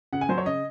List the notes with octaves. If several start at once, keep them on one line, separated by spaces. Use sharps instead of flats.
C#3 F#5
G#5
F#3 C5
C#5
C#3 D#5